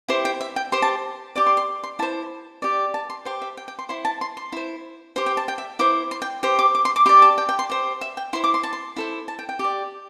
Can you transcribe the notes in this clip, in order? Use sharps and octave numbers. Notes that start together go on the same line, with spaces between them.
E4 G4 C5 C6
G5
E5
G5
G4 C5 C6
A5
G4 D5 D6
C6
C6
C6
E4 C5 A5
G4 D5
A5
C6
G4 C5 C6
E5
G5
G5
C6
E4 C5 C6
A5
C6
C6
E4 C5
G4 C5 C6
G5
A5
G5
E5
E4 C5 D6
C6
G5
G4 C5
D6
D6
C6
D6
G4 D5 C6
A5
G5
G5
C6
G4 C5
E5
G5
E4 C5 C6
D6
C6
A5
C6
E4 A4 C5
A5
G5
G5
G4 D5